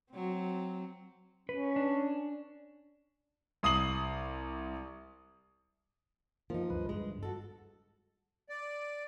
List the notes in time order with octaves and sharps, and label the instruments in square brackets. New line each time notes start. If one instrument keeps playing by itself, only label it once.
[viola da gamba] F#3 C4
[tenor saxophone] C#4 [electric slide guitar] B4
[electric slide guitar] D4
[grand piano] C2 D#6 C7 F#7
[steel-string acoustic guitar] F3 D#4 [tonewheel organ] A#3
[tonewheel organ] D2 G2 B4
[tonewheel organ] G2 [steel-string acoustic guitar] G#3
[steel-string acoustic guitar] F#4 A4
[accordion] D5